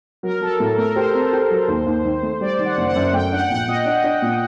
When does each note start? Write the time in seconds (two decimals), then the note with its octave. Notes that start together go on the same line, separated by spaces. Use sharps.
0.23 F#3 A#4
0.41 F#3 A4
0.60 A2
0.78 A3 A#4
0.95 G4 C5
1.14 C4
1.33 G4
1.50 F#3
1.68 D#2
1.86 D#2
2.05 D#3
2.23 A3
2.41 G3 D5
2.59 D#3
2.65 F#5
2.77 F#1
2.89 F#5
2.95 F#2
3.13 A3 G5
3.32 D4 F#5
3.50 A#1 F#5
3.68 A#2 D#5
3.85 D4
4.04 D4
4.22 A#2